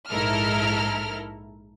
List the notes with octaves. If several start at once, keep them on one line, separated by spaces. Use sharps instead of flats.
A#1 G#2 E4 A4 A#4 F6